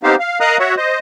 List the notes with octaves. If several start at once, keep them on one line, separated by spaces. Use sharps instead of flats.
B3 C4 D#4 G4 C5 F5
F5
A#4 D#5 F5 A#5 D#6 F#6
F#4 C#5 E5 F#5
C5 D#5